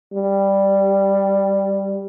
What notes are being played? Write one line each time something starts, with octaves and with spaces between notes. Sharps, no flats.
G3